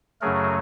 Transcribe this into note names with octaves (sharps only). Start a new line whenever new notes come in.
F#2 C#3 F#3 A3 G#4 A#4